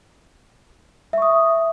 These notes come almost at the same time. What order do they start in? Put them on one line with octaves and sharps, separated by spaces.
E5 C#6 D#6